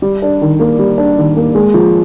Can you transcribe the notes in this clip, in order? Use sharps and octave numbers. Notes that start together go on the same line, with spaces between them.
G3
D4
D#3
A#3
G3
D4
D#3
A#3
G#3
F3